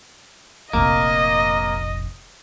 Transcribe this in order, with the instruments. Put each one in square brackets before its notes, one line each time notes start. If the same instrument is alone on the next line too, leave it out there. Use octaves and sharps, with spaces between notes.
[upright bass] F1 A#1 [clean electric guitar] A#3 [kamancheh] D#5